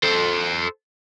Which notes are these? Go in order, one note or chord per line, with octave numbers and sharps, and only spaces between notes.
A4 C5